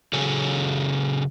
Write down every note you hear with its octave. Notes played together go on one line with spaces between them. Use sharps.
C#3 F#3 G#4 A4